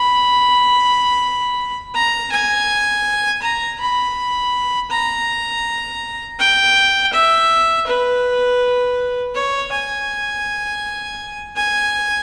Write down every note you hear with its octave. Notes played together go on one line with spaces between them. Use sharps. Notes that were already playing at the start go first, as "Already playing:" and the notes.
Already playing: B5
A#5
G#5
A#5
B5
A#5
G5
E5
B4
C#5
G#5
G#5